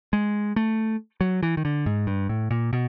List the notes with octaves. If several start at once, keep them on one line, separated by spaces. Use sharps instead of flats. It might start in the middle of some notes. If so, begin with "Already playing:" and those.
G#3
A3
F#3
E3
D#3
D3
G#2
G2
A2
A#2
B2